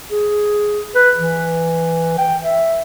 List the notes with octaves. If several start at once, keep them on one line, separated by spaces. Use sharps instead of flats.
G#4
B4
E3
G5
E5